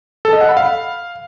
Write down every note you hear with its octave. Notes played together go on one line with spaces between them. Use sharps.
A4
D#5
F#5
B5
F5